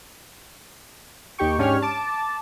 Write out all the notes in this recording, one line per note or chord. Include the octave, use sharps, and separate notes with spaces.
D#2 D#4 G4 G5 C#6
G#2 C#4 D4 G4 C#5 F6
A5 D6